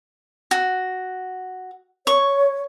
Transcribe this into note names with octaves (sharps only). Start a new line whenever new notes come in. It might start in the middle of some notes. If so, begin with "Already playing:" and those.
F#4
C#5 C#6